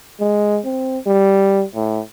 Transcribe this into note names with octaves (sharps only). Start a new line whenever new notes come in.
G#3
C4
G3
A2